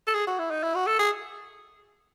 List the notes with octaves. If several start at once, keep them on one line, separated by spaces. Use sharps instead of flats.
A4
G#4
F#4
E4
D#4
E4
F#4
A4
G#4